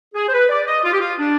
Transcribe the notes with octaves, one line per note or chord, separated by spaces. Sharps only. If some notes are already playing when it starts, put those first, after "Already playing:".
G#4
C5
B4
D5
D#5
F4
G4
F4
D4